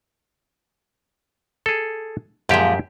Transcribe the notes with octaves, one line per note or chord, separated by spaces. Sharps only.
G#4 A4
F#2 A#2 F3 G#3 G4 E5